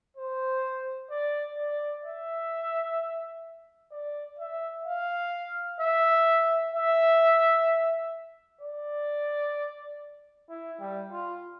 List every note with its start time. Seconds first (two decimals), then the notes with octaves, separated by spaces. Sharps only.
0.17 C5
1.11 D5
1.58 D5
2.04 E5
3.92 D5
4.39 E5
4.86 F5
5.80 E5
6.74 E5
8.61 D5
10.49 E4
10.80 G3
11.12 F4